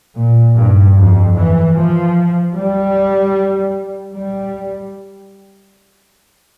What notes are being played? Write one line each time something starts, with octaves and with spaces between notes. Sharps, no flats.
A#2
G2
F2
E3
F3
G3
G3